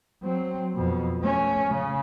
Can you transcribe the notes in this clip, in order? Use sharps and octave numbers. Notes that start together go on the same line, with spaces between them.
F#3 C4
F2 B2
A3 C#4
C#3